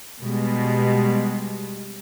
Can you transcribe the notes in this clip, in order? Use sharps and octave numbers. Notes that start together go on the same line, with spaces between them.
B2 G3 G#3